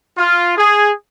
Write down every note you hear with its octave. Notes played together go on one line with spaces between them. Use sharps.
F4
G#4